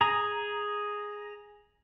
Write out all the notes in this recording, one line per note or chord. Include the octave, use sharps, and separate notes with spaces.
G#4 A#5